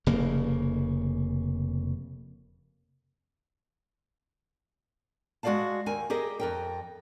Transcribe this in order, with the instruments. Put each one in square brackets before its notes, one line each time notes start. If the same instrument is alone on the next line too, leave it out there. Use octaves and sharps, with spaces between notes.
[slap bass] F1 C#3 A#3
[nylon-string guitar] G#3 F#4 G#4 D5 F5 A5
D#2 A#4 G#5
G4 G#4 A#4 D#5
F2 A#4 G5